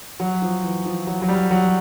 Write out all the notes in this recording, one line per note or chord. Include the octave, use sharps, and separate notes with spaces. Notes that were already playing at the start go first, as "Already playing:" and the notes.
F#3
F3
E3
F3
F#3
F#3
G3
F#3